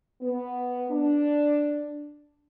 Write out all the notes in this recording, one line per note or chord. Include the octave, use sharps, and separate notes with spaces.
B3
D4